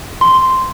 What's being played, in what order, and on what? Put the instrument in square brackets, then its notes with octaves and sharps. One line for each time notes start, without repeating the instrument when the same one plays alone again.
[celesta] C6